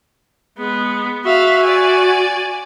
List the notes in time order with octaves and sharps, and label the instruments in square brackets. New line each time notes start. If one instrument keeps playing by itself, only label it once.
[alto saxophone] G#3 [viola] B3
[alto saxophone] F#4 [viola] E5 F5
[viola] D5 G#5